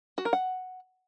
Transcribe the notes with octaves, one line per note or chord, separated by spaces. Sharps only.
F#4
A#4
F#5